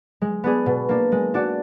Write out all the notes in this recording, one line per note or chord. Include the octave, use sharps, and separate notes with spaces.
G#3
B3 D4 G#4
B2
A#3 D4
G#3
D4 F#4 D5